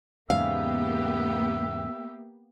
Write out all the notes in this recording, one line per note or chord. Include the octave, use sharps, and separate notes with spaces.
E2 G#2 C#3 A#3 B3 G4 E5 F5